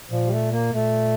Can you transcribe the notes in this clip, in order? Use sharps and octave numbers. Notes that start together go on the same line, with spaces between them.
A#2 F3
G3
A3
A#3
A#2 A3